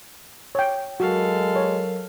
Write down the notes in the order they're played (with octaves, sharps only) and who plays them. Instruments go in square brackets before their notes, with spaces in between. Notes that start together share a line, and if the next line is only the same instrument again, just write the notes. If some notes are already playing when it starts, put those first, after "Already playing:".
[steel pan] C#5 G5
[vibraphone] F#3 A#4 [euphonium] G#3 [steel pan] F#4 [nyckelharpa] A4 F5
[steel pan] C#5